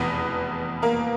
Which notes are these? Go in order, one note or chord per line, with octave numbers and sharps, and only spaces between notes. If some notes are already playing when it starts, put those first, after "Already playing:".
Already playing: F1 E2 B2 B3 B4
A#3 A#4